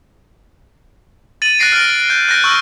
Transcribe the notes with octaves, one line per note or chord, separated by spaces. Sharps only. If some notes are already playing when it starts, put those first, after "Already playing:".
A6 D#7 F#7
F#6 A6 A#6 C7 D7
F6 A6 D7
G6
F#6 G6 A#6 D7
C#6 E6 F6 D#7